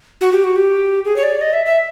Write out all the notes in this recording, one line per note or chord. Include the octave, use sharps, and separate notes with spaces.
F#4
G4
F#4
G4
G#4
C#5
D5
D#5
E5
E5